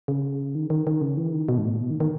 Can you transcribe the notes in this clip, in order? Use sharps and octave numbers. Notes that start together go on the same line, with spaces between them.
C#3
D#3
D#3
D#3
C#3
E3
D#3
B2
G#2
A2
B2
D#3
D#3